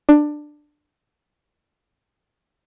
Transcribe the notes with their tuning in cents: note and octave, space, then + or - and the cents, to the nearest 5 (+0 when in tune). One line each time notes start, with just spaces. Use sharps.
D4 +15